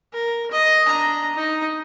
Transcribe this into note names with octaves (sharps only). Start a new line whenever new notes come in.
A#4
D#5
D4 A#5
D#4